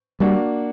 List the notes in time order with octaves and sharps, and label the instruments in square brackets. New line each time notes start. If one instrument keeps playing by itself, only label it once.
[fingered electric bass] G3 [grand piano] A#3 D4 F#4